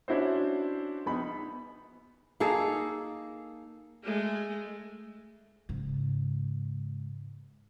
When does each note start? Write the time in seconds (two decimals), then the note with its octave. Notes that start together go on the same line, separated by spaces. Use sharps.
0.08 C#4 D4 E4 F#4 C5
1.06 A#1 B3 D#4 B5
2.40 A#3 D#4 G#4 A4
4.02 G#3 A3
5.69 G#2 C#3